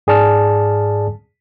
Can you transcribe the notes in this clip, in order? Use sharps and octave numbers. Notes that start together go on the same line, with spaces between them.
G#2 G#4 D5 A5 F6